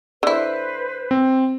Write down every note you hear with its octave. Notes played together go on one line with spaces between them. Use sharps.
D3 E4 B4 C5
C4